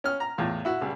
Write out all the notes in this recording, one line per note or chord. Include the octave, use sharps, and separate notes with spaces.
C#4 F6
A#5
E2 A2 F4
E4 F#4
C#2 G3